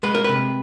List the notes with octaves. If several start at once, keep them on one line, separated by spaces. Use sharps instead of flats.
G#3 B4
A#4
C3 B4